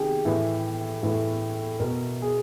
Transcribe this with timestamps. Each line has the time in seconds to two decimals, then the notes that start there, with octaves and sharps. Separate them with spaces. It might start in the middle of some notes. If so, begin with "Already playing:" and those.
Already playing: C3 D#3 G4 G#4
0.25 A2 E3
1.03 A2 E3
1.80 B2 A#4
2.22 G#4